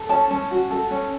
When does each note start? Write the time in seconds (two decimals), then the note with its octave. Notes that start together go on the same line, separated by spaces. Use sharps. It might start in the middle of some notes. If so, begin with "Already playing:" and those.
Already playing: A4
0.09 C#4 A5
0.31 C#4
0.51 F#4
0.71 A4
0.91 C#4